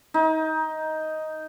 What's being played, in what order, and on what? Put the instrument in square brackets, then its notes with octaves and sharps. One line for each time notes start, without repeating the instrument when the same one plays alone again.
[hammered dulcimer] D#4